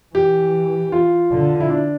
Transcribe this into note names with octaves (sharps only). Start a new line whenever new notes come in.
E3 G4
F4
D3
E4
D4